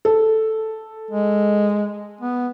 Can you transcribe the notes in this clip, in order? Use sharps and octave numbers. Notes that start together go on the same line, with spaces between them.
A4
G#3
B3